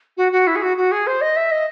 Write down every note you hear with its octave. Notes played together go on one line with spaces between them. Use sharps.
F#4
F#4
E4
G#4
F#4
F#4
G#4
C5
D#5
E5
D#5